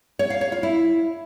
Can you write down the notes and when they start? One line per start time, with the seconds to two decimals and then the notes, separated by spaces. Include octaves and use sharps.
0.19 C#5
0.30 F5
0.41 C#5
0.52 F4
0.63 E4